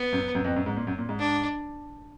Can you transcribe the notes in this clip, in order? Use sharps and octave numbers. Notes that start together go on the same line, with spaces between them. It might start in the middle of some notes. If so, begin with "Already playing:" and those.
Already playing: B3
F#2
F#2
F2
F#2
G#2
A#2
F#2
A#2
G#2
D4